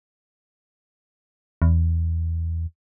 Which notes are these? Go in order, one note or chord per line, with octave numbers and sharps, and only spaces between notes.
E2